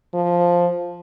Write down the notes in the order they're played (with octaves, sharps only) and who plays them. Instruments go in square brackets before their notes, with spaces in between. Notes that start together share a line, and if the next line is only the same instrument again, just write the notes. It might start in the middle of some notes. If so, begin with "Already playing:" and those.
[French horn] F3